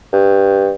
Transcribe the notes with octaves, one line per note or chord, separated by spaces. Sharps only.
G2